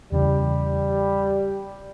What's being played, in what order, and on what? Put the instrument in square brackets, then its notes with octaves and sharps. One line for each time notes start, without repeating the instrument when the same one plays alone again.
[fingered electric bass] E2 C#3 E3 [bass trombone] G3